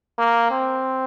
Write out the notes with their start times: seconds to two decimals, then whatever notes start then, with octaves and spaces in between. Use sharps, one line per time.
0.19 A#3
0.51 C4